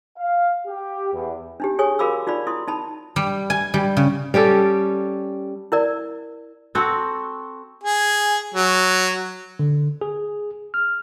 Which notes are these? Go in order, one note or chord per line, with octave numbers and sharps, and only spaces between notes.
F5
G4
E2
D4 D#4 G4
G#4 C#5 G#5 C#6 D#6
F#4 A#4 F5 B5 D6 E6
D#4 F4 D5 B5
E4 C6 D#6
D#4 A5 B5
G3
G#5
G3
C#3
G3 C#4 G4 A4
E4 A#4 D5
C4 F#4 A4
G#4
F#3
D3
G#4
F6